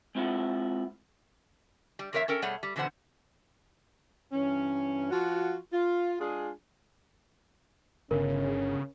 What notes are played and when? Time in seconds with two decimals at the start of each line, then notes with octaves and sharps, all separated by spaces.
0.15 G#3 C4 E4 F4 F#5
1.99 G3
2.13 E2 A3 A#4 C#5 E5 F5
2.28 C#4 A4 A#4 G5
2.42 B2 G3 A3 G#4 C#5 F#5
2.63 G3
2.76 B2 D3 E3 B3 C5 F#5
4.32 G2 E3 C#4
5.11 F3 F4 F#4
5.72 F4
6.19 G#3 D4 F4 G#4
8.11 G1 C#3 C#4 A#4